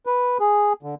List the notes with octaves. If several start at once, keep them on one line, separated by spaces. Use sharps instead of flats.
B4
G#4
D3